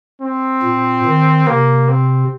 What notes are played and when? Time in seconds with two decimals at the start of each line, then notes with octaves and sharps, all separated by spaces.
0.22 C4
0.63 A#2
1.05 D#3
1.47 C3 A#3
1.89 C4